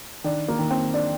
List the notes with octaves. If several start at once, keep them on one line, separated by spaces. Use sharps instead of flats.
D#3 D4
A#3
D#3
C4
D4